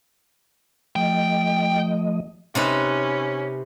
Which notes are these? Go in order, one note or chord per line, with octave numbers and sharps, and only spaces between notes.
F3 A3 D#5 G5
C3 C#4 D#4 B4